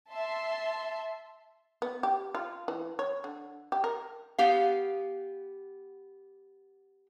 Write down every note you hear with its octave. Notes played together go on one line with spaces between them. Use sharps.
E5 A5 C6
B3
G4
F4
E3
C#5
D3
G4
A#4
B3 G4 F5